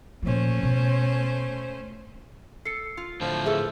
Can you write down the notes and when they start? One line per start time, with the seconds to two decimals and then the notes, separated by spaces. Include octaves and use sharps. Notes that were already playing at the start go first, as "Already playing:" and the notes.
0.22 A#2 F3 A3 C#4 C5
0.63 B2
2.65 A4 C7 C#7
2.97 F4
3.21 A2 D3 F3
3.46 G#4 A4 B4 E5